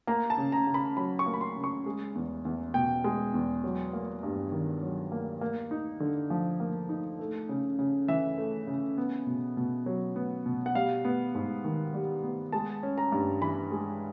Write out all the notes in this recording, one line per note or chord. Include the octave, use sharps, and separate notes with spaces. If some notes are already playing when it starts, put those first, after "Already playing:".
A#3 A#5
A5
C#3
A#5
C#3
B5
F#3 B5
C#6
A#3
B5
C6
C#3
C#6
G#3
E2
E2
B2 G5
G#3
E2
F#3
A#3
G2
D#3
F#3
A#3
A#3
D#4
D3
F3
A#3
D#4
A3
C#3
C#3
E3 E5
A3
C#3
B3
B2
B2
F#3
B3
B2
F#5
G3 F5
B3
G#2
D#3
G3
B3
G#3 A5
C#4
A#5
G2
E3 B5
G#3